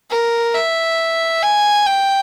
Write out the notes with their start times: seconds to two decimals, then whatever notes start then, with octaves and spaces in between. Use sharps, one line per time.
0.10 A#4
0.54 E5
1.42 G#5
1.86 G5